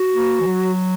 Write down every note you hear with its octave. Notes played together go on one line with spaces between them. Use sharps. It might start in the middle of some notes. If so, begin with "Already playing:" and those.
Already playing: F#4
A#3
E3
F#3